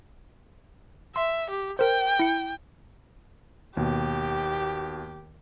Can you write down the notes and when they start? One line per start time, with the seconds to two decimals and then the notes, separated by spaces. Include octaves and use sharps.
1.16 E5 C6
1.50 G4
1.79 A#4 C5 G5
2.19 E4 C#7
3.77 D#2 B2 G4